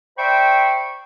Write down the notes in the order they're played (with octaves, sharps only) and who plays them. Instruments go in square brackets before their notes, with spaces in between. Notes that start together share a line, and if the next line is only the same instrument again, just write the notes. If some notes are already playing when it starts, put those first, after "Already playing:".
[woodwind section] C5 D5 E5 G5 B5 C#6